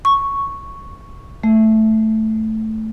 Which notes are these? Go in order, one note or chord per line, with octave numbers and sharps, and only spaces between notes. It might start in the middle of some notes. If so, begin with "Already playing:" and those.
C#6
A3